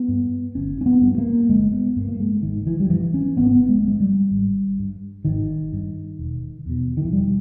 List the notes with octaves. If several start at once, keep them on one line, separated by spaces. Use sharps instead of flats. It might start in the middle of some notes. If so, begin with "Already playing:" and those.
Already playing: B3
G2
G1 C#4
C#4
B3
G2
A#3
G1 G#3
B3
G2 A#3
A#3
G#3
G#1 D#3
E3
G3
G2 E3
C#4
G#1 B3
C#4
B3
G#3
G2 G#3
G3
G#1
G2
G#1 D#3
G2
E1
E2 B2
D#3
E3
E1 G3